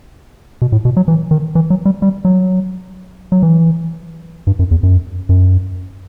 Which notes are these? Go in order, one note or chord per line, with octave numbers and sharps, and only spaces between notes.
B2
A2
B2
F#3
E3
D#3
E3
F#3
G3
G3
F#3
F#3
E3
G2
F#2
E2
F#2
F#2